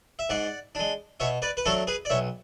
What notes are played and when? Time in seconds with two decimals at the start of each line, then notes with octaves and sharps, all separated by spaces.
0.19 E5
0.30 G#2 D5 F#5
0.75 G#3 D4
1.20 B2 C#5 E5
1.42 B4 D5
1.57 B4
1.66 F#3 A3 D4 A4 C#5
1.87 G#4 B4
2.05 D5
2.10 B1 C#5 E5